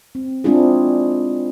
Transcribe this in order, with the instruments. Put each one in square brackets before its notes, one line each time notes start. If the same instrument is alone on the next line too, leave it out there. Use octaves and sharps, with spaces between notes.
[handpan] C4
G#3 C4 D4 E4 F4 G#4